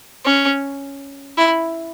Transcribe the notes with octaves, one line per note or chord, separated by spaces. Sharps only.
C#4
E4